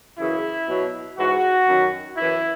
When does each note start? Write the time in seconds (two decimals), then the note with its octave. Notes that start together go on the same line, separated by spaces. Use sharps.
0.19 F#2 C#3 E3 E4
0.68 B2 F#3
1.18 G#2 E3 F#4
1.68 F#2 D#3 F#3
2.17 F#2 E3 E4